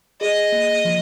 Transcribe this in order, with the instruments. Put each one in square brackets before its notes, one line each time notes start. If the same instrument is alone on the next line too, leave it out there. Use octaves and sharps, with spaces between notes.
[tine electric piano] G#4 [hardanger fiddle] D#5
[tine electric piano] A#3
F3